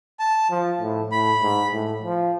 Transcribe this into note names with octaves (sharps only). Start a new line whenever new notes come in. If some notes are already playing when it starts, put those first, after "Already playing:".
A5
F3
A2
A2 B5
G#2
A2
F3